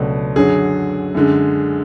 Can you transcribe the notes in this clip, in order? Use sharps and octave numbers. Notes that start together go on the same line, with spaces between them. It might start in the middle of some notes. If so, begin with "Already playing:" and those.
Already playing: C#2 B2 F#3 A3 D4
F#2 D3 F#3 G#4
F#2 D3 G#3